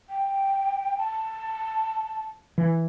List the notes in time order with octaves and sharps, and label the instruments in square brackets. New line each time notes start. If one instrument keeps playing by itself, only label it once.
[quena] G5
A5
[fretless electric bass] E3